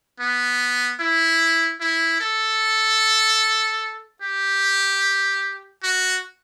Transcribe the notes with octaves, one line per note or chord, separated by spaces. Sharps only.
B3
E4
E4
A4
G4
F#4